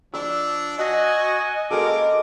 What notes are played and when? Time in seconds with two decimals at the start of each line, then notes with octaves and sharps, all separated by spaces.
0.14 F3 D4 E6
0.78 F#4 D#5 G#5
1.71 C#3 G#3 A#3 F#4 A4 A#4 D6